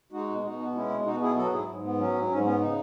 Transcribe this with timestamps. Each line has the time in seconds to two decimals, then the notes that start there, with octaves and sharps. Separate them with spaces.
0.12 G#3 D#4 F#4
0.28 B2
0.44 B2 D#4 F#4
0.59 B3
0.74 G#3 C#4 E4
0.89 B2
1.05 B2 D#4 F#4
1.20 B3 E4 G#4
1.36 F#3 F#4 A4
1.51 G#2 E4 G#4
1.67 G#2
1.83 B3
1.98 F#3 C#4
2.13 G#2
2.29 G#2 C#4
2.45 B3 C#4
2.60 C#3 D#4